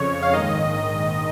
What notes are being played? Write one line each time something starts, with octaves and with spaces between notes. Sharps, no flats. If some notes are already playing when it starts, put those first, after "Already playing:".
Already playing: F2 C#3 C#5
F5
A#1 G#2 D#3 D#5